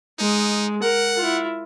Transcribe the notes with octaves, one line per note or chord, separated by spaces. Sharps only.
G#3 D#4
A#4 F#5
E4 F4